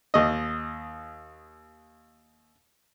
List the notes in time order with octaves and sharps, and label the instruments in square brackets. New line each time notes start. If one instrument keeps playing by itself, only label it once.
[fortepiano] D#2 D#5